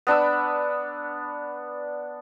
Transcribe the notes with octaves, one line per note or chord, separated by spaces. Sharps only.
B3 D4 B5 E6